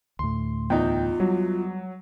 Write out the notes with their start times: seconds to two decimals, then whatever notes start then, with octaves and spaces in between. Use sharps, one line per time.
0.19 D2 A2 C6
0.70 E2 D#4 F4 G5
1.20 F#3 G3